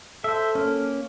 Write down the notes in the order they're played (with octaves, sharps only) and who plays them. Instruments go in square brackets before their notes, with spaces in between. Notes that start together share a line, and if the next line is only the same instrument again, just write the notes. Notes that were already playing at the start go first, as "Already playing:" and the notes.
[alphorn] A4 [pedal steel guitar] C5 E5
[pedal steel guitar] A#3 C#4